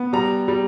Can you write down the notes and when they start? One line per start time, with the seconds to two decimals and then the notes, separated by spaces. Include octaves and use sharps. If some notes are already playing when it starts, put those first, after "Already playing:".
Already playing: B3
0.13 G3 A#5
0.48 G3